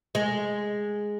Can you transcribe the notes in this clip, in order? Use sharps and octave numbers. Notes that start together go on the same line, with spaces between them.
G#3